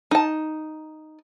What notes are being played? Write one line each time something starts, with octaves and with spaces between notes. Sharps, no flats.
D#4 A5